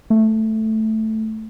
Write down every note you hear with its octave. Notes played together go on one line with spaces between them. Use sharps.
A3